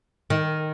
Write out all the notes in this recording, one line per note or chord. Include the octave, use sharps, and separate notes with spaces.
D#3